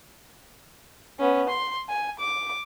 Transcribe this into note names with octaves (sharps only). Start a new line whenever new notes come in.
B3 C#4
C6
G#5
D6